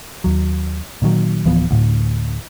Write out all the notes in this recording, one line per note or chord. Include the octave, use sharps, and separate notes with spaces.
D#2 F#3
A#2 D#3 F#3
D1 E3 F3 B3
D2 A2